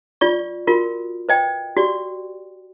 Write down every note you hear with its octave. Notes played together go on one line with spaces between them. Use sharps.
F4 D5 C#6
F4 F#4 A#4
B4 D#5 G5
F#4 G4 D5